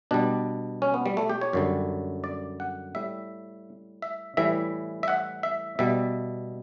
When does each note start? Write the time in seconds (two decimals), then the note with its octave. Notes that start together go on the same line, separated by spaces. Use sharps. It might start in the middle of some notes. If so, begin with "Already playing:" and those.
0.11 B2 G3 D4
0.82 C#4
0.94 B3
1.06 G3
1.17 A3
1.30 G4
1.41 C#5
1.53 F#2 D3 G3
2.24 D5
2.60 F#5
2.95 A2 G3 E5
4.02 E5
4.37 A2 E3 G3 E5
5.03 E5
5.08 F#5
5.43 E5
5.79 B2 G3 E5